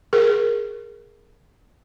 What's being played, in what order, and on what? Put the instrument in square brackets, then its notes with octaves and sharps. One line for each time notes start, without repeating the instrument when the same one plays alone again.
[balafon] G#4 A#4